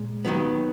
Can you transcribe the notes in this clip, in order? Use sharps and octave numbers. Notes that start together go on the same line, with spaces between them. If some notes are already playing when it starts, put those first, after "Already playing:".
Already playing: A#2 G#3
D#2 D#3 F#3 B3